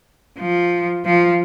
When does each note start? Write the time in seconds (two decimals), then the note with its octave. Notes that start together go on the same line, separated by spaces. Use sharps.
0.38 F3
1.05 F3